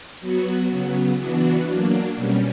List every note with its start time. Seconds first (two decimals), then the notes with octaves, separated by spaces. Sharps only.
0.20 F#3 B3 F#4
0.69 C#3 F#3 B3
1.17 E3 B3 D4 F#4
1.66 F#3 A#3 D4
2.16 B2 G3 C#4